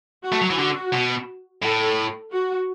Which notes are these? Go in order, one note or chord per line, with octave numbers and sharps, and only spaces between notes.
F#4
A3
F#3
E3
D3 F#4
B2
A2 A4
F#4